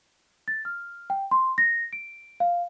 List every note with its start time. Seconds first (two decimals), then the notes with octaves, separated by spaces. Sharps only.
0.48 A6
0.65 F6
1.10 G5
1.31 C6
1.58 A#6
1.93 D7
2.40 F5